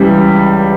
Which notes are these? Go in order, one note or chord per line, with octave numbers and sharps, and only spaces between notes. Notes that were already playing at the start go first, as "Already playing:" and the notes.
Already playing: C#2 C#3 E3 G3